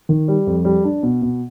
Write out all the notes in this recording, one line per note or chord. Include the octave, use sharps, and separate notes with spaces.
D#3
G3
F2
G3
D4
B2
B2